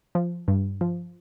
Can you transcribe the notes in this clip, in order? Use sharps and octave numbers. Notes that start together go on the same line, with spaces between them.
F3
G2
F3